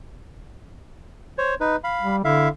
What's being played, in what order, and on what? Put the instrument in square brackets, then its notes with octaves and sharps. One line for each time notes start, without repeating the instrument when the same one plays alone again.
[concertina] C5 C#5
D#4 B4
F5 B5
[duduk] G3
[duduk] D3 [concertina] E4 E5 F5